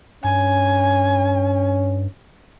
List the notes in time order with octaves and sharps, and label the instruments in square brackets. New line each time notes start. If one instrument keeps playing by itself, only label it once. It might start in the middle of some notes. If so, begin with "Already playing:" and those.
[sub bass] G2 [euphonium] C#4 [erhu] G#5